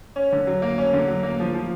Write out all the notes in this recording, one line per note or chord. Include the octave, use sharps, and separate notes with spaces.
C#4
D3
F#3
A#3
C#4
D3
F#3
A#3
F3
F3